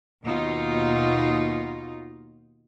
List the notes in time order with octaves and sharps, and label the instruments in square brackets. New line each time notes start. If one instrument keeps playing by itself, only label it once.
[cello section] D#2 B2 D#4 F4